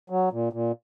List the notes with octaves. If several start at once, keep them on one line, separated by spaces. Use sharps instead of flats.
F#3
A#2
A#2